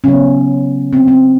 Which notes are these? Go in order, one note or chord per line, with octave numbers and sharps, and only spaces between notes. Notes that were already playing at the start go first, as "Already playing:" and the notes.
C#3 F#3 B3 C#4
C4
C4